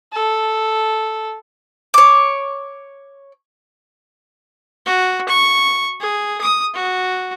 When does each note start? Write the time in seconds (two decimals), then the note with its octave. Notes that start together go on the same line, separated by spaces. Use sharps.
0.14 A4
1.94 C#5 D6
4.86 F#4
5.29 C#6
6.01 G#4
6.41 D#6
6.74 F#4